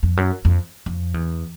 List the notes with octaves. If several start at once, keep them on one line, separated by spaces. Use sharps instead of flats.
F2
F#2
F2
F2
E2